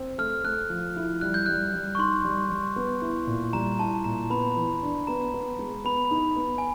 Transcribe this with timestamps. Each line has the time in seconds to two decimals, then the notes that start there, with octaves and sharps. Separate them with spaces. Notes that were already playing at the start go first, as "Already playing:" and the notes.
Already playing: C4
0.18 A3 F6
0.44 A3 F#6
0.70 F3
0.96 E4
1.21 G3 F#6
1.34 G6
1.46 G3 F#6
1.74 G3
1.95 C#6
1.98 D#4 C6
2.25 G3
2.50 G3
2.76 B3
3.02 E4
3.27 A#2
3.53 G3 A#5
3.79 E4 A5
4.04 A#2 A#5
4.30 B3 B5
4.56 E3
4.83 D4
5.07 B3 A#5
5.34 B3
5.59 G#3
5.85 B3 B5
6.11 D#4
6.36 B3
6.58 G#5